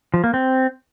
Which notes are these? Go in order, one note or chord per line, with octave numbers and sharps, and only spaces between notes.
F3
A#3
C4